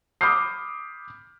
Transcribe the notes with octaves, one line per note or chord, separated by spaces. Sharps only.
B5 D6 D#6 F6 G6 C7